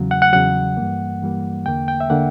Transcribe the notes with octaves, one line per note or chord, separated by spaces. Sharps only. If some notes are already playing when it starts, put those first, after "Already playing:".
Already playing: E2 C#3 F#3
F#5
F#5
E2 C#3 F#3 F#5
G2 E3 G3 A#3
G2 E3 G3 A#3
E2 D3 A#3 G5
G5
E5
D3 A#3 F#5